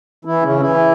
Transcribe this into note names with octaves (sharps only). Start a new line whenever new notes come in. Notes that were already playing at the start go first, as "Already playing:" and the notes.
E3 E4
C#3 C#4
E3 E4